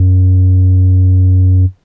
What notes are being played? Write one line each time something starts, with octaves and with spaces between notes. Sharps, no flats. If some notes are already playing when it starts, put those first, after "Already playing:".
Already playing: F#2